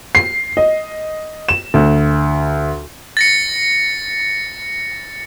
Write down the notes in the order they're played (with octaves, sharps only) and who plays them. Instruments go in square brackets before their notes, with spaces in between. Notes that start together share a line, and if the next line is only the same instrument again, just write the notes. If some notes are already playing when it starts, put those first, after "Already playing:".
[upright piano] C7
D#5
E7
D2
[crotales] A6 A#6 C#7